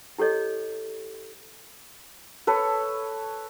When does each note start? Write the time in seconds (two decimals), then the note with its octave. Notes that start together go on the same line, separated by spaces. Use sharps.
0.18 E4 G4 A4 C#5 D#5
2.47 A4 B4 C#5